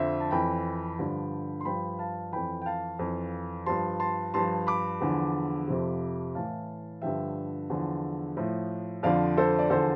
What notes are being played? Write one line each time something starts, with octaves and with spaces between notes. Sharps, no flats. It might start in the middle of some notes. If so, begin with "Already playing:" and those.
Already playing: F2 D3 F3 C5 E5
A5
F2 E3 G5 B5
G2 D3 F3
C6
G2 F3 G5 B5
F5 A5
F2 E3 G5 B5
G5
F5 A5
F2 E3
G2 F3 A5 C6
A5 C6
G2 F3 A5 C6
B5 D6
E2 D3 F3
F2 C3 F3
A2 E3 F5 A5
G2 D3 F3 E5 G5
E2 D3 F3
A2 F3
F2 D3 F3 D5 F5
A4 C5
D5
E2 D3 F3 A4 C5